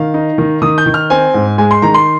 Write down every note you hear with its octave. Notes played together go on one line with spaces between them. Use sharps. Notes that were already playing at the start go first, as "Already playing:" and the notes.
Already playing: D#3 F5
D#4
D#3
D#3 D#6
G6
D#3
F6
C4 G#5
G#2
G#3 G#5
C6
D#3 A#5
C6